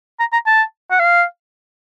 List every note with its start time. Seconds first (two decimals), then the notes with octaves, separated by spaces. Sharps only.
0.20 A#5
0.33 A#5
0.46 A5
0.91 F#5
0.99 F5